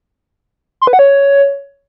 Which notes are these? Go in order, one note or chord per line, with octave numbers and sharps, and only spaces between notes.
C6
B4
F#5
C#5